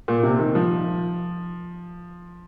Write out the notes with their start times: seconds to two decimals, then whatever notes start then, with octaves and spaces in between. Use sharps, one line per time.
0.08 A#2
0.23 C3
0.39 D#3
0.55 F3